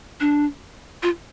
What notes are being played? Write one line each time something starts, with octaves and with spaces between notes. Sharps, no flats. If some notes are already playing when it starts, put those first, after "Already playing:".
D4
F4